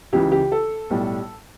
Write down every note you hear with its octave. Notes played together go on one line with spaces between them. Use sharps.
C#2 C#3 E3 G4
G4
A4
B1 A2 G3